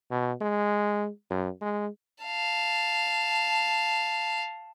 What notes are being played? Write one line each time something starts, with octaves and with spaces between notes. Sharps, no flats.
B2
G#3
F#2
G#3
F5 A5